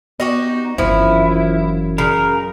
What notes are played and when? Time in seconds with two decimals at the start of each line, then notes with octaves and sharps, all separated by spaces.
0.20 B3 D#4 F#4 G4
0.78 G1 F#2 E3 F3 E4
1.98 C#3 A#4